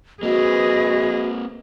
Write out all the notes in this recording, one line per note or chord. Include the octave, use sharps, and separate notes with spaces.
A#3 C4 F#4 G#4 B4 D#5